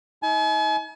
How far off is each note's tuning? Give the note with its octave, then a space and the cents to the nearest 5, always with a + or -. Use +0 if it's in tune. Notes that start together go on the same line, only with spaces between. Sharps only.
D#4 +40 G#5 +45